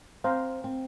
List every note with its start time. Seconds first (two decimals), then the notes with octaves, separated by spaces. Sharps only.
0.24 C4 C5 F5 A#5
0.64 C4